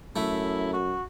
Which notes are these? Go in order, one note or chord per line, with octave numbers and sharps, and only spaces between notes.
F#2 A3 E4
F#4